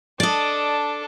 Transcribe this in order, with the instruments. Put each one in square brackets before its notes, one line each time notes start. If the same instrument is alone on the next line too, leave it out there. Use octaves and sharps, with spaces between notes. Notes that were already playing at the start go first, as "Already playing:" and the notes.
[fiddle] D4 A4 [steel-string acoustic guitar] D5 D#5